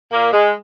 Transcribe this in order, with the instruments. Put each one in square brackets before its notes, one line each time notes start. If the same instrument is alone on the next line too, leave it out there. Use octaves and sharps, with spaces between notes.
[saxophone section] A#2 A#3
G#3